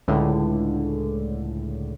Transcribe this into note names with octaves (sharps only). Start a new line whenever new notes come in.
C#2 A2 D3